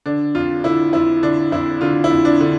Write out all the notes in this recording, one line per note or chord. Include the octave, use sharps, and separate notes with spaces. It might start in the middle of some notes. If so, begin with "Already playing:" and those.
D3 D4
F2 F4
D3 E4
F2 E4
D3 D4
F2 E4
D3 F4
E4
F2
D4
D3